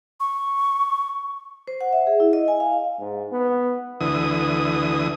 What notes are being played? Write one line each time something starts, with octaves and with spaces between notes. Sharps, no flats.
C#6
C5
F#5
E5
G#4
E4
D#5
G#5
F5
G#2
B3
D2 E3 D#6